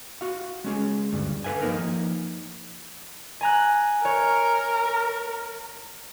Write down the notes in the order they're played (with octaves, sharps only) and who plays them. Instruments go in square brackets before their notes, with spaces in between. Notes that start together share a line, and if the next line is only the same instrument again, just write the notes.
[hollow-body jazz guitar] F#4 F5
G#3 C#4 G#4
D2 G2
A4 B4 F5 G#5
F3 F#3 A#3 D#4 A#4
[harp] G#5 A#5 F#6
[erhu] A#4 [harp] C#5